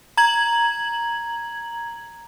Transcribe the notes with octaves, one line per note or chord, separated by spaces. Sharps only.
A#5 G#6 F#7